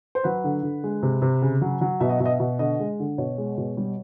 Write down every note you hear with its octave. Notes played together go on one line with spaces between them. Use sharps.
C5
F#3 B4
D3
D3
G#3
C3
C3
C#3
F#3
F#3
B2 E5
D#5
B2 E5
D#5
E5
B2
D3 D#5
G#3
D3
B2 C#5
G#3
B2
G3